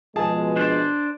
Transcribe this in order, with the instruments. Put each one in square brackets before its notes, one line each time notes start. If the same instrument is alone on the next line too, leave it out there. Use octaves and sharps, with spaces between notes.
[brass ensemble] B2 F3 G#3 [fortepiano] G#4 A5
[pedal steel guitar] D4 C5 D5